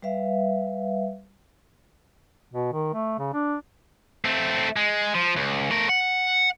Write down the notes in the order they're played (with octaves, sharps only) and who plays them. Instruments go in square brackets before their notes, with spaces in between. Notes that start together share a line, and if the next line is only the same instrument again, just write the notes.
[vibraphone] G3 B4 E5 F5
[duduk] B2
D#3
A3
C#3
D4
[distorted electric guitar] A3 C4
G#3
F3
C#2
A3 A#4
F#5